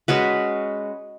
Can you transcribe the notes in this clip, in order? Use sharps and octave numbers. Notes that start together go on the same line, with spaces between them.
G#3 C#4 F#4 B4